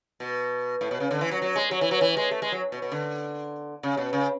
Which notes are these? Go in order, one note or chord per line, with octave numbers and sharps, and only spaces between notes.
B2
A2
B2
C#3
D3
E3
F#3
F#3
G#3
F#3
E3
F#3
E3
G#3
A3
G#3
F#3
B2
B2
D3
C#3
B2
C#3